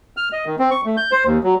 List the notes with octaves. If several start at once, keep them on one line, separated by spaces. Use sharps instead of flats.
F6
D#5
D#3
C4
C#6
A3
G6
C5
D#2
F#3